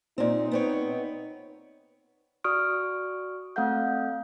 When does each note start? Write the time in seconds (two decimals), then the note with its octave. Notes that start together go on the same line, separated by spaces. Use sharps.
0.18 A#2 C4 D#4
0.51 B3 C4 C#5
2.44 F#4 D5 C#6 D#6 F6 D7
3.56 A3 C4 A4 F5 F#5 G6